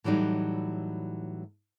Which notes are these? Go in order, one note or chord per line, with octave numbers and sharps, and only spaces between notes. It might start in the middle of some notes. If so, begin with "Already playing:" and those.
A2 E3 F#3 G3 D#4